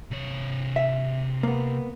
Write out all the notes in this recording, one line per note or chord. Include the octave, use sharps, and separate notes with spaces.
C3 C#5
E5
A#3 B3